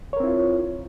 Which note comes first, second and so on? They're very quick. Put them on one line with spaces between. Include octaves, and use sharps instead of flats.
C#5 A#4 C4 E4 F4